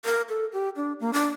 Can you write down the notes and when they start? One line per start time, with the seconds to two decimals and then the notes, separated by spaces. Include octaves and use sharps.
0.05 A#4
0.29 A4
0.53 G4
0.76 D4
1.00 A#3
1.13 D4